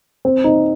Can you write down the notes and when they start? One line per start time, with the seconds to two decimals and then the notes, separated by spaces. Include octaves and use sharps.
0.25 C4
0.44 D#4